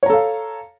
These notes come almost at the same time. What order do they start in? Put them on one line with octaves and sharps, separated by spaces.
C#5 A#5 A4 F5